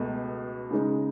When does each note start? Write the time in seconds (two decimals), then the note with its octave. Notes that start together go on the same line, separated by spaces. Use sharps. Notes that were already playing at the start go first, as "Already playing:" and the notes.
Already playing: C#2 B2 A3
0.71 C#3 G#3 D#4